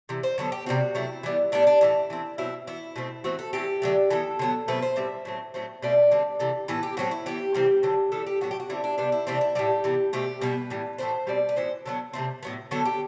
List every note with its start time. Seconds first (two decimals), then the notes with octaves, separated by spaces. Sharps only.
0.09 C3 E3
0.23 C5
0.38 D3 F#3 B3 A4
0.52 G4
0.66 C3 G3 C4 F#4
0.95 C3 F#3 A3 E4
1.23 E3 G3 B3
1.52 A2 G3 B3 D4
1.67 D4
1.81 A2 E3 B3 E4
2.10 E3 A3 C4
2.38 B2 F#3 C4 E4
2.67 E3 B3 E4
2.96 B2 A3 C4
3.24 E3 A3 C4 F#4
3.39 A4
3.53 E3 A3 C4 G4
3.82 D3 F#3 A3
4.10 E3 B3 A4
4.39 D3 F#3 B3
4.68 B2 F#3 A3 C4 B4
4.82 C5
4.96 A2 G3 C4 E5
5.25 A2 F#3 C4
5.54 A2 F#3 A3 C4
5.82 B2 A3 C4 D5
6.11 D3 G3 C4
6.40 C3 E3 A3
6.68 A2 E3 B3 B4
6.83 G4
6.97 A2 F#3 C4 F#4
7.11 E4
7.26 E3 B3 G4
7.54 C3 E3 G3 C4
7.83 D3 F#3 C4
8.12 E3 G3 B3 A4
8.26 G4
8.41 A2 F#3 B3 F#4
8.51 G4
8.60 F#4
8.70 D3 G3 C4 E4
8.84 D4
8.98 C3 G3 B3 D4
9.12 E4
9.27 C3 E3 A3 C4 D4
9.41 E4
9.55 A2 E3 G3 G4
9.84 C3 E3 B3
10.13 B2 A3 C4 G4
10.41 B2 G3 B3 B4
10.70 A2 E3 G3
10.98 A2 E3 A3 C4 C5
11.27 B2 G3 C4 D5
11.49 B4
11.56 A2 E3 B3 C5
11.86 D3 F#3 B3
12.13 C3 E3 A3 C4
12.43 A2 F#3 B3
12.71 D3 F#3 B3 A4
12.85 G4